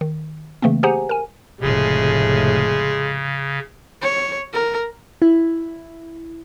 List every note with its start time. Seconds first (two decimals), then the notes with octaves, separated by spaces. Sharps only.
0.01 D#3
0.62 C#3 E3 A3 A#3 C4
0.83 G4 G#4 C5 F#5 G#5 A#5
1.09 A#4 G#5
1.61 F1 A2 C#3 G#3
4.02 C#5
4.53 A#4
5.22 E4